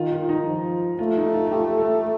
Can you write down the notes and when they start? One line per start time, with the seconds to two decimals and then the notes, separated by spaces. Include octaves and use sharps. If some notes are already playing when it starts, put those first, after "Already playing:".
Already playing: D#3 F4
0.12 F4
0.29 D#4
0.47 F3
0.99 A3 F4
1.17 D#4
1.34 F4
1.47 F4
1.52 G4
1.78 A4